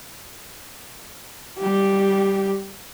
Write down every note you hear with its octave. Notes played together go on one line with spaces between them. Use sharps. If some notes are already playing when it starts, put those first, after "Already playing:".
G3 G4